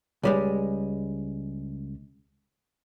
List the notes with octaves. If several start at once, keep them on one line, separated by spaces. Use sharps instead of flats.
C#2 G3 G#3